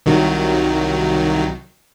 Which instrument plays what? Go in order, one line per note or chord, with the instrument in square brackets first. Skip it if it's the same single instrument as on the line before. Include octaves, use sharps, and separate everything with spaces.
[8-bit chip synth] C2 D#3 F#3